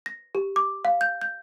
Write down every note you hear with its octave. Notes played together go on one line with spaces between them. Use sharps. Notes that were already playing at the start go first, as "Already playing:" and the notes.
A#6
G4
D6
F5
G6
G6